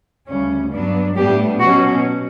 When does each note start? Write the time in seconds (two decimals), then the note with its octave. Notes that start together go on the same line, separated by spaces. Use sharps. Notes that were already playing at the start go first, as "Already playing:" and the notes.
0.29 D2 C#3 G3 C#4
0.72 G2 F#3 B3 D4
1.16 A2 G3 B3 D4 G4
1.60 B2 F#3 C#4 F#4